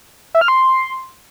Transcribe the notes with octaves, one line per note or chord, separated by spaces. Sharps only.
E5
F6
C6